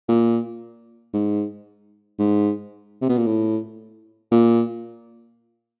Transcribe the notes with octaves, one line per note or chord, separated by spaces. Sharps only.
A#2
G#2
G#2
C3
B2
A#2
A2
A#2